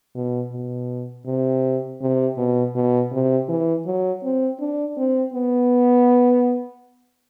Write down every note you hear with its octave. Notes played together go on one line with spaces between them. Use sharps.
B2
B2
C3
C3
B2
B2
C3
E3
F#3
C4
D4
C4
B3